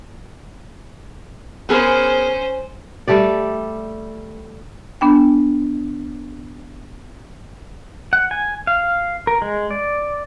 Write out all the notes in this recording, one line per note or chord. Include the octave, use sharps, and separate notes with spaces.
B3 C#4 G#4 A#4 C5
G3 A3 G4 D5
B3 D4 G5
F#5
G#5
F5
A#4
G#3
D5